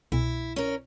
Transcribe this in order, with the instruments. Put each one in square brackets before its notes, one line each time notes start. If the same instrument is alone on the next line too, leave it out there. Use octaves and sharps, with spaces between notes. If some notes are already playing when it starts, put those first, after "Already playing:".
[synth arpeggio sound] C2 B2 [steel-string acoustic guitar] E4
[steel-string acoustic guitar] C#4 A#4